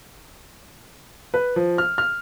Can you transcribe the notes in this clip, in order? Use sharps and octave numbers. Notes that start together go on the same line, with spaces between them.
B4
F3
F6
F6